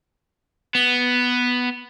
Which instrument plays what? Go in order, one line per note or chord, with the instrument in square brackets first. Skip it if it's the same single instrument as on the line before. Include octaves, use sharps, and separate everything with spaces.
[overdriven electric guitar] B3